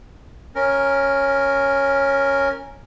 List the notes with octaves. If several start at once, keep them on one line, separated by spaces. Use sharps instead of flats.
C#4 A#4